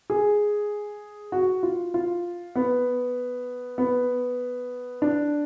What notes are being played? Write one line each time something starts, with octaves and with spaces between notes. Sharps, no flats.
G#4
F#4
F4
F4
B3
B3
D4